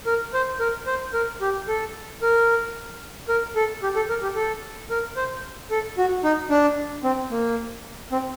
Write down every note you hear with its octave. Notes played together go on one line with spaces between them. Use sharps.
A#4
C5
A#4
C5
A#4
G4
A4
A#4
A#4
A4
G4
A4
A#4
G4
A4
A#4
C5
A4
F#4
D#4
D4
C4
A#3
C4